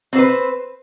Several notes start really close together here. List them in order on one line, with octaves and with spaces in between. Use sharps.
C4 C5 B4